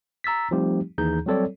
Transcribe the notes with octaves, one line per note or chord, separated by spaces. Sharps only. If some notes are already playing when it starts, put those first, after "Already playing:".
A#5 E6 A6 B6
F3 G3 A3 C4 D#4 G4
D#2 E3 D#4 G#4 A#5 G6
F#3 G3 C4 A4 C#5 D5